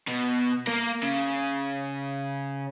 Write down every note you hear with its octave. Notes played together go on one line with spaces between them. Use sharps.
B2
A#3 A#4
C#3